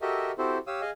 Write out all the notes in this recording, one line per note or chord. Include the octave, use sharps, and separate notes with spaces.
F#4 G4 A4 A#4 D#5 E5
C4 E4 F#4 G4 A4 C5
G4 C#5 F5 D#6 E6
G#4 D#5 F5 G#5